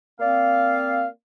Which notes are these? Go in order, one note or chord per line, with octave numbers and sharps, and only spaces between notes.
A#3 C4 D5 F5